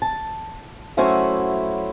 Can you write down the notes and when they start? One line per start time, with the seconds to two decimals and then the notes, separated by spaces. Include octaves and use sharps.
0.02 A5
0.97 F#3 A3 C#4 E4 F#4 C5